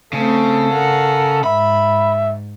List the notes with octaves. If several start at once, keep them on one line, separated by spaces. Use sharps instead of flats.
C#3 A3 C4 A4
A#4 F#5
G#2 E5 B5